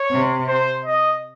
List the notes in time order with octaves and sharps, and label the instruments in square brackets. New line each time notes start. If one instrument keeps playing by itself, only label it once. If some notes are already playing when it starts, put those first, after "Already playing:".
Already playing: [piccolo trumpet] C#5
[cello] C3
[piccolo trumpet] C5
D#5